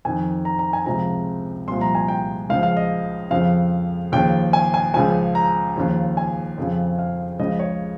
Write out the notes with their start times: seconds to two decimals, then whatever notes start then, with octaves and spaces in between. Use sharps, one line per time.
0.05 F2 D#3 G#5
0.45 A#5
0.59 A#5
0.73 G#5
0.86 C#2 C3 F3 A#5
1.67 C2 A#2 F3 C6
1.81 A#5
1.95 G#5
2.08 G5
2.49 C#2 C#3 F3 F5
2.63 F5
2.77 D#5
3.30 F2 C#3 F3 F5
4.12 D#2 C#3 F3 G5
4.53 G#5
4.74 G#5
4.94 C#2 C#3 F3 G#5
5.35 A#5
5.76 D#2 C#3 F3
6.17 G#5
6.58 F2 C#3 F3
6.99 F5
7.39 C#2 C#3 F3 D#5
7.60 C#5